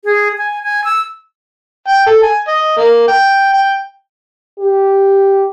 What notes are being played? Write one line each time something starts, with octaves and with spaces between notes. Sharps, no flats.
G#4
G#5
G#5
E6
G5
A4
G#5
D#5
A#3
G5
G5
G4